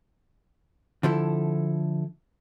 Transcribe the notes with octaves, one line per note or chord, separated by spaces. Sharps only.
D3 F3 E4 A4